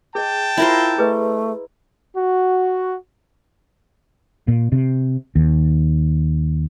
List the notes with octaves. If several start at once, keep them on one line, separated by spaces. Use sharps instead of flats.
G#4 D#5 G5 A5
E4 F4 A#4 C5
A3 G#4 B4 D#5
F#4
A#2
C3
D#2